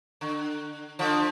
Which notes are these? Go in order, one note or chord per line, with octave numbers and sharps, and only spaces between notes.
D3
D3 F3